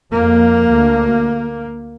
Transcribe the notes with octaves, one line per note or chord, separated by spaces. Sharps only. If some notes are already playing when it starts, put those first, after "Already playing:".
F2 A#3
D2